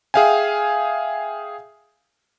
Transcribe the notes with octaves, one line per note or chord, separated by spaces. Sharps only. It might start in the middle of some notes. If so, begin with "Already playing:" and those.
G#4 E5 F5 G5 G#5